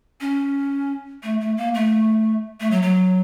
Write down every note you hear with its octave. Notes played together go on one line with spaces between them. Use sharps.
C#4
A3
A3
A#3
A3
A3
F#3
F#3